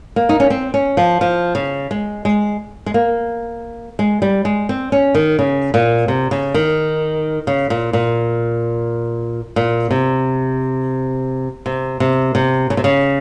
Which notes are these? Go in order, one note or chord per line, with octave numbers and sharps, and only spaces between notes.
A#3
D#4
C#4
C4
C#4
F3
F3
C#3
G#3
G#3
G#3
A#3
G#3
G3
G#3
C4
C#4
D#3
C#3
A#2
C3
C#3
D#3
C#3
A#2
A#2
A#2
C3
C3
C3
C3
C#3
C3
C#3